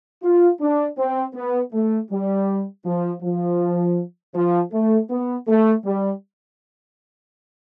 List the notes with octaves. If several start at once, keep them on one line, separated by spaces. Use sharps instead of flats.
F4
D4
C4
B3
A3
G3
F3
F3
F3
A3
B3
A3
G3